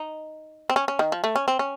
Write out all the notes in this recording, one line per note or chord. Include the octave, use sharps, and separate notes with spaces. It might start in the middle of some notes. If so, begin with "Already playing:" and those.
Already playing: D#4
C4
C#4
C#4
D#3
F3
A3
C#4
C4
C#4